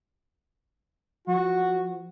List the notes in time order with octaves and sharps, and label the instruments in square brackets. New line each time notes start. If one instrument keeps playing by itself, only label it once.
[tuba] F3 [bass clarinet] F#4